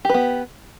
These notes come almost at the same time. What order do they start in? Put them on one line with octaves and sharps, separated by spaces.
G4 B4 B3